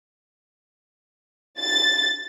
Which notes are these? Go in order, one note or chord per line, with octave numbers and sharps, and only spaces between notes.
A6